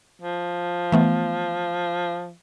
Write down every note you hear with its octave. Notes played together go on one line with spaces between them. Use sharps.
F3
E3 A3 B3